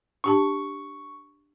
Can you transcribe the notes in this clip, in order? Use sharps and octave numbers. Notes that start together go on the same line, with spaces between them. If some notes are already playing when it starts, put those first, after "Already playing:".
D4 G4 A5 C#6